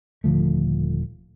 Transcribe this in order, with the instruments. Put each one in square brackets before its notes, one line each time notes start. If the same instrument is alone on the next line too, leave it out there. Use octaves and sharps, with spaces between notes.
[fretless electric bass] D#1 D3 F3 A3